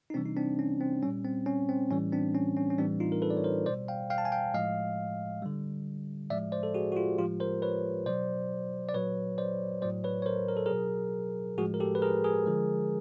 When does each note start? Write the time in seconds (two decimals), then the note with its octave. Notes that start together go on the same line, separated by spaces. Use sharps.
0.10 D#4
0.14 C3 E3 G3 C4 D4
0.26 D#4
0.36 C4 D4
0.59 C#4
0.81 C4
1.03 G3 C#4
1.07 A#2
1.25 C4
1.46 C#4
1.69 C4
1.91 A2 E3 G3 C#4
2.12 C4 D4
2.35 C#4
2.57 C#4
2.70 C#4
2.78 A2 E3 G3 C4 D4
3.00 D#4 F4
3.12 A#4
3.22 A4 B4
3.30 D5
3.37 C#5
3.44 A#4 C5
3.66 B2 G3 C5 D5
3.88 F5 G5
4.10 F5 G5
4.18 A5
4.25 G#5
4.32 F5 G5
4.54 A2 F3 G#3 D#5 F5
5.42 D3 G3
6.30 A2 F3 G#3 D5 E5
6.52 C5 D5
6.63 A4
6.74 F#4 G#4
6.92 F#4
6.96 F4 G4
7.18 A2 F3 G#3 F4 G4
7.40 A#4 C5
7.62 B4 C#5
8.06 B2 F#3 C5 D5
8.89 D5
8.94 A#2 F#3 B4 C#5
9.38 C5 D5
9.82 A2 F#3 C5 D5
10.04 B4 C#5
10.22 C#5
10.26 A#4 C5
10.48 A#4
10.57 A4
10.66 B2 F#3 G#4 A#4
11.58 A2 F3 G#3 F#4 G#4
11.74 A#4
11.80 G4 A4
11.95 B4
12.02 G#4 A#4
12.24 G#4 A#4
12.46 D3 F3 G#3